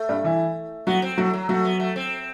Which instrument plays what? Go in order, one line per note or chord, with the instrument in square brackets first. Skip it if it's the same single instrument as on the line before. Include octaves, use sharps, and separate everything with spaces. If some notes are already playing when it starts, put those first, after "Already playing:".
Already playing: [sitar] A3
[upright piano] G2 G3
E3 E4
[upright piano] F#3 F#4 [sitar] B3
[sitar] C4
[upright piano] F#3 F#4 [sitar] A3
[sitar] F#3
[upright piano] F#3 F#4 [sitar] A3
[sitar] B3
A3
C4